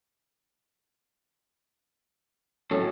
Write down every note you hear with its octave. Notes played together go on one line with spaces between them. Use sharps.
A2 F#3 C#4 A4